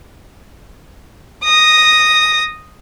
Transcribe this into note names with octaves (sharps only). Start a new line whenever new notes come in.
D#6 A#6